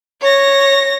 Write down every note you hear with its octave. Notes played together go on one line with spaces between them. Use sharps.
C#5 A#6